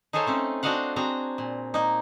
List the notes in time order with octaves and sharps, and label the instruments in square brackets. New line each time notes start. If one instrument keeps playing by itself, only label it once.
[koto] D#4 G#4 A4 C5 C#5 F5
A3 C4 C#4
C4 D4 F#4 D#5 F5 F#5
C4 F#4 G#4 A#5
A#2
A#3 D#4